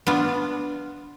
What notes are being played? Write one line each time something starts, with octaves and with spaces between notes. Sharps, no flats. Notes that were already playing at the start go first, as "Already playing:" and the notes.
B3 D4 F4